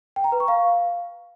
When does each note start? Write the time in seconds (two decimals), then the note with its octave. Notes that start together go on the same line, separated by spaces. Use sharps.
0.16 G5
0.24 A#5
0.32 B4
0.40 C#6
0.48 F5